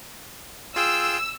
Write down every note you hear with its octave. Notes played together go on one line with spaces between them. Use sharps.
F4 G#4 G5 E6